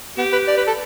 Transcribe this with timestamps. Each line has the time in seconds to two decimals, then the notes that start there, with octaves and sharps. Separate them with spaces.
0.17 B3 G4
0.32 B4
0.48 D5
0.57 B4
0.67 A4